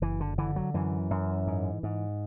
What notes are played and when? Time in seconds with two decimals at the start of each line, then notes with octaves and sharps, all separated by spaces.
0.02 F#1 E3
0.20 D3
0.38 D3 E3
0.56 F#3
0.74 F#2 E3
1.10 F#2
1.47 G#2
1.83 G#2